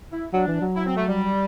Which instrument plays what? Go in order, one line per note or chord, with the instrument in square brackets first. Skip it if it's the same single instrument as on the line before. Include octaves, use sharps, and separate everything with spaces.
[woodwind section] E4
[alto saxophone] F#3 [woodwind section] D4
[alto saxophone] E3
F#3
[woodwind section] E4
C4
A3
G3